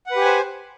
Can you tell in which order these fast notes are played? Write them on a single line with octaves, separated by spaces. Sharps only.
F#5 B4 G4 G#5 C5